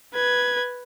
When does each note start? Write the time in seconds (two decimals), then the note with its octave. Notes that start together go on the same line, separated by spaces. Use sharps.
0.14 B4 G#6